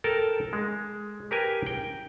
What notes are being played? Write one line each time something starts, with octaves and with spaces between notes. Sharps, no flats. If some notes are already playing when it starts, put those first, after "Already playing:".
A4 A#4 G5 A5
G#3
G4 G#4 A#4 B4 G5 G#5
G5